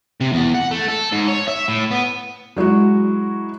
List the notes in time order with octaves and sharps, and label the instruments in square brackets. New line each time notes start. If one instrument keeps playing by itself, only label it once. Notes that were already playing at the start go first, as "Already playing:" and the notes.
[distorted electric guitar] C3
E2
F#5
A3
A4
G#2
C#5
E5
A2
B3
[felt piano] F#3 G#3 E4 F#4